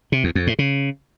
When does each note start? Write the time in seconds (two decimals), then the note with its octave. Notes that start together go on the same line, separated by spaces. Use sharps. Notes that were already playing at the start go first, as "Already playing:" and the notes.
0.12 C3
0.24 E2
0.35 F2
0.47 A2
0.59 C#3